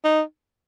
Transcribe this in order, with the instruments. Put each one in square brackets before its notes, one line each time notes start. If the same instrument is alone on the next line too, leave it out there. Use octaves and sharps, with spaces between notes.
[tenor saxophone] D#4